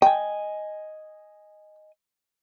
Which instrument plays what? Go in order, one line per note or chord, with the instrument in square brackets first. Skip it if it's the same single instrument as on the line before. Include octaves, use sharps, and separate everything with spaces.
[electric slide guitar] D#5 G#5 [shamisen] G5